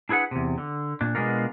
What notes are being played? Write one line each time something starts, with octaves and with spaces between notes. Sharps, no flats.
D4 E4 G#4 B4 F#5
E2 C3
D3
A#2 D4
B2 G#3 B3 D4 F4 A#4